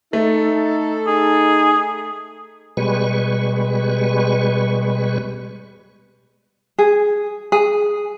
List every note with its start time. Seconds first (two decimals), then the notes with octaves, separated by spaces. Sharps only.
0.13 A3 D#4 A4
1.07 D#4 G#4
2.77 B2 G3 G#3 B4 C#6
6.79 G#4
7.52 G#4